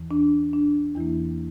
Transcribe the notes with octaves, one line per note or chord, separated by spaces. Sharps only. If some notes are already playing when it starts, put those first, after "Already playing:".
Already playing: E2 E3
D4
D4
E2 E3 A#3 E4